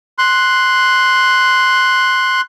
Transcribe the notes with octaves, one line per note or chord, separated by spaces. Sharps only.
C6 F#6